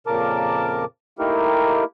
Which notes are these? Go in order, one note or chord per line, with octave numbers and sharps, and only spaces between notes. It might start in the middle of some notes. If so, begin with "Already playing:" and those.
F2 A#2 C#3 A#4 A5 D6
A3 A#3 D#4 E4 G4 A#4